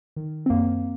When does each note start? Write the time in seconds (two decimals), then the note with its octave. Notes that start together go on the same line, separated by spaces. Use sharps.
0.16 D#3
0.46 C4
0.50 F#2 A#3